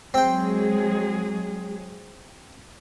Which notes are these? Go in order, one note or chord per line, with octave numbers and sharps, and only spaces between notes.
F#3 G#3 C4 G#4 G5